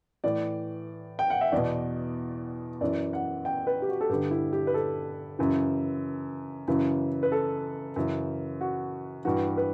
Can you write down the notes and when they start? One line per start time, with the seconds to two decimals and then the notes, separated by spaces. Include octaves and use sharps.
0.24 A2 E3 D5
1.19 G5
1.30 F#5
1.41 E5
1.52 E2 B2 D5
2.81 F#2 E3 D5
3.13 F#5
3.45 G5
3.67 B4
3.82 G4
3.89 F#4
4.01 A4
4.09 G2 D3 G4
4.31 E4
4.53 G4
4.67 B4
4.74 A4
5.39 F#2 C#3 E3
6.68 F#2 C#3 E3
7.23 B4
7.32 A4
7.96 F#2 C#3 E3
8.61 F#4
9.25 G2 E3 F#4
9.57 B4